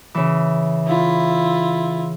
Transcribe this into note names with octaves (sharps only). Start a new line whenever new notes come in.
C#3 E3
E4 F4